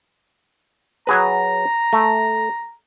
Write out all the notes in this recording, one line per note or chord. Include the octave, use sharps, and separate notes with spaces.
F#3 G#4 B4 A#5
A3